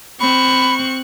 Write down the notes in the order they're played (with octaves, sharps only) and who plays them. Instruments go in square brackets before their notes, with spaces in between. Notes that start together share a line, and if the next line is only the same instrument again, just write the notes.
[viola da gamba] C4 [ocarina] B5 [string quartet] C#6 F#6